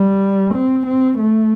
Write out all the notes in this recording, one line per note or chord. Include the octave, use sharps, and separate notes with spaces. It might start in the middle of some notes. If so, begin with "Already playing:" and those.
Already playing: G3
C4
C4
A3